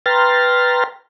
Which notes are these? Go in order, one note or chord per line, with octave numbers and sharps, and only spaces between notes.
B4 G5 A#5 C6 F6 A6